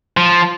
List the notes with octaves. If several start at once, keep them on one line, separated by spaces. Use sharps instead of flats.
F3